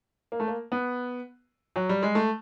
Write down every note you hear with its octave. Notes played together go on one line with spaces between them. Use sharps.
A#3
A3
A#3
B3
F#3
G3
G#3
A3